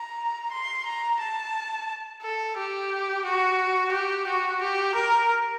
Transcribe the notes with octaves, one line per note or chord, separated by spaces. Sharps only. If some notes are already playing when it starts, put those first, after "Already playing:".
Already playing: A#5
C6
A#5
A5
A4
G4
F#4
G4
F#4
G4
A#4